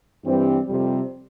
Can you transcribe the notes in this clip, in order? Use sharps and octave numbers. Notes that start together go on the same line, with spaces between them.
G2 E3 G3 C4
F2 C3 G3